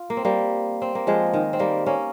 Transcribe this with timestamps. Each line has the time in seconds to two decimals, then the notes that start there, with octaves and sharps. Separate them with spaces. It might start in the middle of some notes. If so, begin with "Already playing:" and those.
Already playing: F4
0.10 A#3
0.17 C4
0.25 G3 A#3
0.82 C4
0.95 A#3
1.07 F3 G#3
1.34 D#3
1.53 C4
1.59 G3 A#3
1.86 A#3 C#4